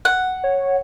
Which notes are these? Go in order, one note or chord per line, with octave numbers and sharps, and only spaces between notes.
F#5
C#5